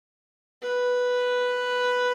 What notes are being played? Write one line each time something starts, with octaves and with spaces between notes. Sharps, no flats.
B4